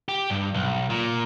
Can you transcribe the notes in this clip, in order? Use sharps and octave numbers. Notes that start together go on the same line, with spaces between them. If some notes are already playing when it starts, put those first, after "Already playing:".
G4
G2
B1
A#2